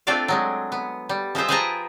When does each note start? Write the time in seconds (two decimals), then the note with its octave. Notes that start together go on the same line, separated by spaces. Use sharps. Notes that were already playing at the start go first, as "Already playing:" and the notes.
0.07 A3 C4 D4 F4 D5 F5
0.28 F#3 G#3 A3
0.72 B3
1.09 G3
1.35 F3 G#3 F4 C5 E5
1.49 G#4 B4 C5 G5 A5 A#5